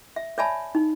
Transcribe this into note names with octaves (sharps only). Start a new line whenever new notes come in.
E5
C#5 D5 E5 G#5 A5 B5
D#4